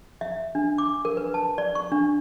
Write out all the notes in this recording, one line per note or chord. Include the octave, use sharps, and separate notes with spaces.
E5
D4
D6
A#4
B4
A5
D5
C#6
D4